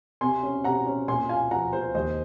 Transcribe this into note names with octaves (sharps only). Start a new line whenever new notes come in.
C3 G#5 C6
C#4
C3 F#5 A#5
C#4
A#2 G#5 C6
F4 F5 G#5
F3 F#5 A#5
F4 C5
D#2 C5 D#5